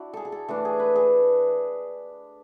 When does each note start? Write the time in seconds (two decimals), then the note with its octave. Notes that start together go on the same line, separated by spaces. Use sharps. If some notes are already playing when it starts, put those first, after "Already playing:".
Already playing: D4 E4 F#4
0.14 G#4 A4
0.25 G#4
0.32 A4
0.48 E3 A3 D4 A4
0.65 G#4
0.80 B4
0.96 G#4